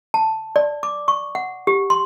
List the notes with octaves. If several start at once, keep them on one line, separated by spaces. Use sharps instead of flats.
A5
D5
D6
C#6
F#5
G4
C6